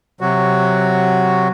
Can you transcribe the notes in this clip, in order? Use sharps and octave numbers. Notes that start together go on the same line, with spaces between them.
C3 F#3 F#4